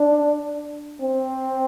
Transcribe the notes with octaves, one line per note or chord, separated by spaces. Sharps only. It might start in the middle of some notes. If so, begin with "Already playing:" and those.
Already playing: D4
C4